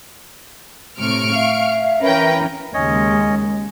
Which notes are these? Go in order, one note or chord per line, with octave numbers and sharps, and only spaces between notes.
A2 C3 C#6 F6 D7
E5 F5
E3 C#4 A#4 B4 G5
D#2 C#3 G#3 C#4 C#5 D#5